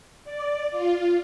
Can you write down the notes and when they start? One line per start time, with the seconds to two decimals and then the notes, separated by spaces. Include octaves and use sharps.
0.25 D5
0.70 F4